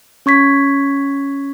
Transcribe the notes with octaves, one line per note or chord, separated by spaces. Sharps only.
C#4 C#6 G#6 B6